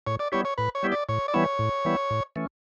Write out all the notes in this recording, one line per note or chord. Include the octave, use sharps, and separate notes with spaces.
A2 C#5
D5
G3 B3 E4 G4 C#5
C#5
A2 B4
C#5
G3 B3 E4 G4
D5
A2 C#5
D5
E3 G3 B3 E4 C#5
A2
E3 G3 B3 E4
A2
E3 A3 C#4